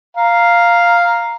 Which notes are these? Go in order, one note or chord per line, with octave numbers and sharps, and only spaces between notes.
F5 A#5